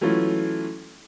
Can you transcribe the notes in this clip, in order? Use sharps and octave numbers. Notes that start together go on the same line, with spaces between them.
E3 F#3 A3 C#4 E4 F4